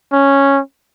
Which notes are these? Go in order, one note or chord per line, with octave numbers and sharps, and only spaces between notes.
C#4